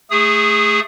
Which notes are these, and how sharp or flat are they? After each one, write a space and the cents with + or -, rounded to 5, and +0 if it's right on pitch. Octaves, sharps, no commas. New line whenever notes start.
A3 +0 G#4 -20 D#6 +0